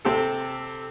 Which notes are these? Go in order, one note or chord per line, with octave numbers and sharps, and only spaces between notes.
C3 C4 G4 A4